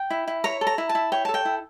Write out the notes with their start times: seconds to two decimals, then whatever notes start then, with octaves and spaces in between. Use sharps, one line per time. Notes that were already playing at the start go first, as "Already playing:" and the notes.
Already playing: G5
0.10 E4
0.28 E4
0.44 C#5 A#5
0.61 A4
0.67 A#5
0.78 E4
0.89 A5
0.95 E4
1.12 C#5 G5
1.25 A5
1.29 A4
1.34 G5
1.45 E4